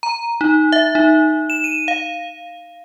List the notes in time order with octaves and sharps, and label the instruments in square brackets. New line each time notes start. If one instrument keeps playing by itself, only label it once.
[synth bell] A#5
D#4
E5
D#4
E7
D#7
F5